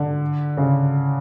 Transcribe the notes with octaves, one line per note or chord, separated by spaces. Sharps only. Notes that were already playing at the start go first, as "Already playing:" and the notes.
Already playing: D3
C#3